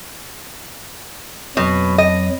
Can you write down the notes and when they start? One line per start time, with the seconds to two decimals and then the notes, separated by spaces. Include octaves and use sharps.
1.57 F2 B2 F#3
1.98 D#5